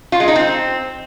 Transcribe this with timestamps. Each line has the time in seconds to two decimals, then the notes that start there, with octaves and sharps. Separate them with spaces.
0.12 F4
0.20 G#3
0.28 D#4
0.36 C4